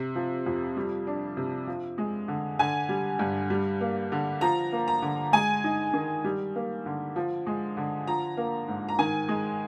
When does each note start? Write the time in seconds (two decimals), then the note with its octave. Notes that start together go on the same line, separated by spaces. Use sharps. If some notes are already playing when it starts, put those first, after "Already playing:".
Already playing: C3
0.15 F3
0.46 F2
0.77 G3
1.07 D4
1.37 C3
1.67 F3
1.98 G#3
2.28 D3
2.59 D3 G#5
2.89 G3
3.19 G2
3.50 G3
3.81 A#3
4.12 D3
4.41 F3 A#5
4.72 A#3
4.88 A#5
5.02 D3
5.33 G#3 G#5
5.64 D#4
5.93 D#3
6.24 G3
6.55 A#3
6.86 D3
7.16 F3
7.47 G#3
7.77 D3
8.07 F3 A#5
8.37 A#3
8.68 G#2
8.89 A#5
8.99 D#3 G#5
9.29 G#3